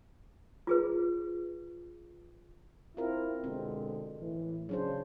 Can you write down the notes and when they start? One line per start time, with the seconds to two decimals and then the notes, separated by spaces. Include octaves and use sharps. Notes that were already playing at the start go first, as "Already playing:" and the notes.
0.67 F4 G#4 B4
2.97 C4 E4 F4 A#4
3.44 B2 D3 G#3 C4
4.21 A2 E3
4.69 C#3 F#3 D4 C5